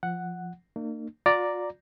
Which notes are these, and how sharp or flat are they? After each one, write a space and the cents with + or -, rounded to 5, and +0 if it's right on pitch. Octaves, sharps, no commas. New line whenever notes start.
F3 +0 F#5 +0
A#3 -35 D4 +45
F4 +45 D5 +0 A#5 +0